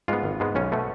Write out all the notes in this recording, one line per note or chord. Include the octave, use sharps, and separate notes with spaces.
G#2 G#3 B3 F4
G#1
G#2 G#3 B3
B1 C#4
B2 A3